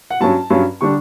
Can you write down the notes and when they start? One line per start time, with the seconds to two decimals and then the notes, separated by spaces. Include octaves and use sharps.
0.10 F#5
0.20 G2 F#3 C#4 A5
0.50 G2 F#3 C#4
0.81 D3 G3 D4 C#6